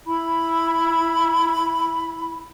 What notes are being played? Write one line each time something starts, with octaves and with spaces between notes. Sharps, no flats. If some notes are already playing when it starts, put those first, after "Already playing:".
E4 B5